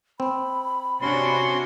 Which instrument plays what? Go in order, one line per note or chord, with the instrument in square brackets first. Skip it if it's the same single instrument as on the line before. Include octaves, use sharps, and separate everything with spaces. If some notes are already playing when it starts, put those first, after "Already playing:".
[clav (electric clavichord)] C4 [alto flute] B5
[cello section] C3 D4 F#4 [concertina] C#4 C6